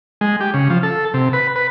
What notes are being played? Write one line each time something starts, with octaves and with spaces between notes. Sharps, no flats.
G#3
G4
C#3
F3
A4
C3
B4
B4